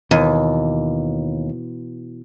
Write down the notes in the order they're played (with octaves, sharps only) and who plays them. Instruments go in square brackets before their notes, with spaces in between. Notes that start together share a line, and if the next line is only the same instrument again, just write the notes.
[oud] D#2 [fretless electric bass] B2 E3